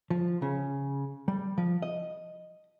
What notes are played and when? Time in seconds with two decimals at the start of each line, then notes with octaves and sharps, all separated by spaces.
0.10 F3
0.42 C#3
1.28 G3
1.58 F3
1.82 D#5